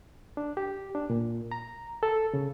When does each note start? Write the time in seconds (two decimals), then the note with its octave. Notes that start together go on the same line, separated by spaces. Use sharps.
0.37 D4
0.57 G4
0.95 D4
1.10 A#2
1.52 A#5
2.03 A4
2.34 C#3